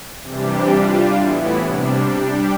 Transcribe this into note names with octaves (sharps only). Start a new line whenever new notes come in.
C3 E3 G3 D4 G4
G3 D4 F4
A2 E3 B3 E4
C3 G3 D4
G3 D4 G4